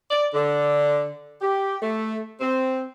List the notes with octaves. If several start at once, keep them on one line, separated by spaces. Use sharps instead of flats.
D5
D3
G4
A3
C4